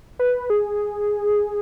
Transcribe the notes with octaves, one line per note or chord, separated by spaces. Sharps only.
B4
G#4